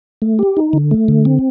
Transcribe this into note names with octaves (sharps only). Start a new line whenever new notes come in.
A3
G4
D#4
D3
A3
D3
C4